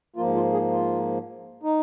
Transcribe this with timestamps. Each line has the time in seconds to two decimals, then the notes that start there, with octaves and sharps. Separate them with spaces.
0.16 G#2 F3 A#3 F4
0.35 F4
0.53 G#4
0.71 F4
1.63 D#4